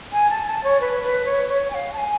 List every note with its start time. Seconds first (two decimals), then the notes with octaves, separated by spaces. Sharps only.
0.12 G#5
0.30 A5
0.46 A5
0.64 C#5
0.81 B4
1.03 B4
1.25 C#5
1.48 C#5
1.70 G#5
1.74 F5
1.93 A5
1.98 G#5